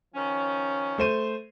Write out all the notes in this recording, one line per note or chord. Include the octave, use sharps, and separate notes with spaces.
D#3 F3 C#4
A3 C5 D#7